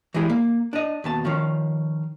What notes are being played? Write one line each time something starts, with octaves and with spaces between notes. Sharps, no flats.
E3 G3 G#3 E4 G#4
A#3
D4 D#5
D#2 B2 A5
D#3 F3 C#4 F4